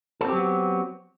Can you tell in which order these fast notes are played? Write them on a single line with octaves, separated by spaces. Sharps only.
A4 C4 G4 F#3 B3